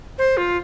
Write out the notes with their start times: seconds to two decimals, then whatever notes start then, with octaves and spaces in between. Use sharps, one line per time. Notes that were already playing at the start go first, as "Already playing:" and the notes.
0.18 C5
0.37 F4